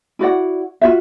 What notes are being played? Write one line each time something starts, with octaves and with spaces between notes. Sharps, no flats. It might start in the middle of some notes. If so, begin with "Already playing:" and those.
E4 F#4 D5 F#5
F4 F#4 E5